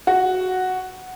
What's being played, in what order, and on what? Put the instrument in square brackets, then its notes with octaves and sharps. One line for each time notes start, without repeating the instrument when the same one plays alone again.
[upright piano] F#4